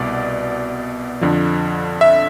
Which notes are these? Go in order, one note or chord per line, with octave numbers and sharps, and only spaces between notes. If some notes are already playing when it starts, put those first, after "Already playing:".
Already playing: C2 B2 D5
F2 D3 F3
E5